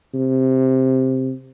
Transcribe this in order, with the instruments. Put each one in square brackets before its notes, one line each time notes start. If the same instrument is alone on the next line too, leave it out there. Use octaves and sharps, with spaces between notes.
[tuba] C3